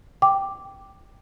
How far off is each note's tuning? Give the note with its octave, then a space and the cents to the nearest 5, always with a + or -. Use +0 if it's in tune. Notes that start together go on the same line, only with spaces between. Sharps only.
G5 +0 D6 +0